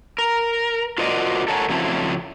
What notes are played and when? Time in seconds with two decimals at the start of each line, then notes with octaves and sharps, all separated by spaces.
0.18 A#4
0.98 F4 F#4 A#4 C5 D5 D#5
1.48 A4 A#4 C#5 F#5 G#5
1.69 C#3 F3 F#3 A3 C4 E4